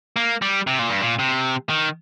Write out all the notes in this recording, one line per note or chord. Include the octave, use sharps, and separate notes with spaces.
A#3
G3
C3
A#2
G2
A#2
C3
D#3